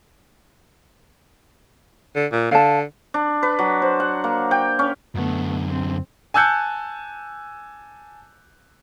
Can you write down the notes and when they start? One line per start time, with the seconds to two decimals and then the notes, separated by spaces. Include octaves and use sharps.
2.16 D3
2.32 A#2
2.51 D3 F5 A5
3.14 D4
3.43 B4
3.59 F#3
3.82 C5
4.00 F#5
4.24 A#3
4.51 G5
4.79 C#4
5.15 F#2 D3 A3 B3
5.70 C4
6.34 G#5 A5 E6 F#6 G6 C#7